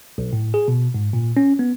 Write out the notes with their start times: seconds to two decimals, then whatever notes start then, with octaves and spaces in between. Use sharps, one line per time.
0.18 B1
0.33 A2
0.54 G#4
0.68 B2
0.94 G#2
1.13 A#2
1.37 C#4
1.59 B3